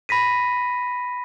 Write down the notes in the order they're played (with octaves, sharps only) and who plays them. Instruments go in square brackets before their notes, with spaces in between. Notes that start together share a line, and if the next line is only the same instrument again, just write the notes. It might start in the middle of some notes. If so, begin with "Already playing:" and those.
[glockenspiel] B5 A#6 B6 D#7